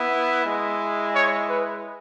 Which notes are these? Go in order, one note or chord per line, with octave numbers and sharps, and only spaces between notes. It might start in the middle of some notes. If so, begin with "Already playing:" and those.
Already playing: B3 E4
G#3 E4
C#5
B4